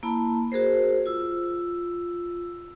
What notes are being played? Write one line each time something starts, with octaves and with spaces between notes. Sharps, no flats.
A#3 E4 A5 B5
F#4 G#4 A#4 C5
F4 E6